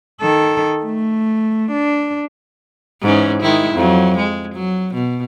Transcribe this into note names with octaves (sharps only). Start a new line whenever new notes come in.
D#3 A4
A3
D4
G#2 E3 C#4
D#3 G#3 E4
F2 F#3
G#3
F#3
B2